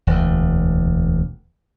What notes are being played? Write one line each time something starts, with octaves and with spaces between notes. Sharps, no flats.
E1 D2